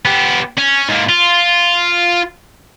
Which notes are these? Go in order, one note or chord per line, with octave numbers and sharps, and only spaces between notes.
B3 G4
C#4
G#2 A#3
F4